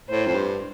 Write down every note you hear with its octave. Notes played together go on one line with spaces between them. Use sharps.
A2 C5
F2
G2